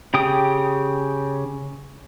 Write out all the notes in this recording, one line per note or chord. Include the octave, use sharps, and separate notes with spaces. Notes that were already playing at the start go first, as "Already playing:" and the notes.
C#3 G4 G5 D#6